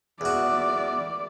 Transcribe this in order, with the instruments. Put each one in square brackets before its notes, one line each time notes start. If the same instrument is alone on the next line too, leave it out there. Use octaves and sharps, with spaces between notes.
[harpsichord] E2 F#4 [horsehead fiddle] D5